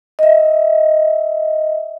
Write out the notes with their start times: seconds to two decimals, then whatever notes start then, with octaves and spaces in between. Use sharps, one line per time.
0.19 D#5 E5